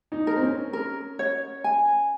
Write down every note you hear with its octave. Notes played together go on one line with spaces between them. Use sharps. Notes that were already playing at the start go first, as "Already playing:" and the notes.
D#4
A#4
C4
C#4
A#4
C#5
G#5